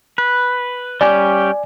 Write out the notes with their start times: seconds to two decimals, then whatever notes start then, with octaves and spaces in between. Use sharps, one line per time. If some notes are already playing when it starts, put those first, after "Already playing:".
0.18 B4
1.01 G3 C#4 G4 D5 G#5